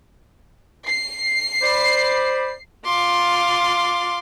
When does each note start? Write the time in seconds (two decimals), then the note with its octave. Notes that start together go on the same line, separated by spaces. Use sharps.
0.85 C7
1.62 C5 D5 B5
2.85 F4 C6 D6